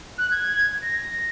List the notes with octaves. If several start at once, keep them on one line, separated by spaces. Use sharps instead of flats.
F#6
G#6
A#6